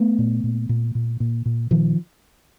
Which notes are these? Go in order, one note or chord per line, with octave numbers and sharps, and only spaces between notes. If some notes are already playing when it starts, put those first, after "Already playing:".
Already playing: A3 B3
A#2
A#2
A#2
A#2
A#2
A#2
A#2 D#3 F3